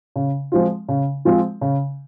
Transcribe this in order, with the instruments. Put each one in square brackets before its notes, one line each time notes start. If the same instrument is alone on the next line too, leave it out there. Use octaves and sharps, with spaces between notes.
[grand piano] C#3
F3 G#3 C4 F4
C#3
F3 G#3 C4 F4
C#3